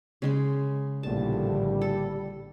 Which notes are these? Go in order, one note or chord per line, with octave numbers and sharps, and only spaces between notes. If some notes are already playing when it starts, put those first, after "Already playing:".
C#3 G#3 C6
A#1 A2 D3 G3 A5
A4